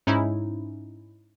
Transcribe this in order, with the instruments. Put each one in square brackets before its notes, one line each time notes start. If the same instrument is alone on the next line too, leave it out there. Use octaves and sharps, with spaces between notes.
[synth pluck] G#2 C#4 D#4 E4